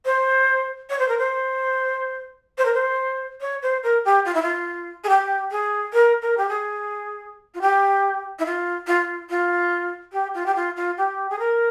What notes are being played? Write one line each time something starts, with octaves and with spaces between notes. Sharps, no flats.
C5
C#5
C5
A#4
C5
C5
A#4
C5
C#5
C5
A#4
G4
F4
E4
F4
G#4
G4
G#4
A#4
A#4
G4
G#4
F4
G4
E4
F4
F4
F4
G4
F4
G4
F4
F4
G4
G#4
A#4